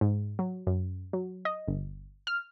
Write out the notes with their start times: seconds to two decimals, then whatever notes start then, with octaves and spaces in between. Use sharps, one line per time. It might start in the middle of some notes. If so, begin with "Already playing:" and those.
0.01 G#2
0.39 F#3
0.67 F#2
1.13 F#3
1.45 D#5
1.68 G1
2.27 F6